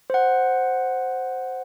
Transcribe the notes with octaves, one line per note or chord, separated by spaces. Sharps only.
C5 F#5